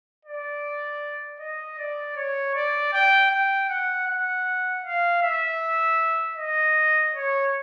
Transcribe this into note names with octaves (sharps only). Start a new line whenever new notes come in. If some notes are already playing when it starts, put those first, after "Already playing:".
D5
D#5
D5
C#5
D5
G5
G5
F#5
F#5
F5
E5
D#5
C#5